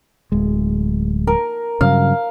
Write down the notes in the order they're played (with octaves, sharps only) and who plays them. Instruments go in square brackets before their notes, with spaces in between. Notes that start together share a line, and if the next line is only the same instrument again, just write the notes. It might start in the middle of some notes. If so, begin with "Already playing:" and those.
[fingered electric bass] D1 G#3
[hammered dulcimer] A#4
[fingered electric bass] G2 C#3 F#3 [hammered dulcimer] F5